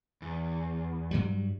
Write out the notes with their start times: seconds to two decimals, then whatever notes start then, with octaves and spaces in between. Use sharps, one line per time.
0.22 E2
1.11 G2 F#3 G3